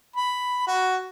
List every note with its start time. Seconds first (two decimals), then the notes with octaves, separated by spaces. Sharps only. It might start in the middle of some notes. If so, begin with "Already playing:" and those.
0.16 B5
0.67 F#4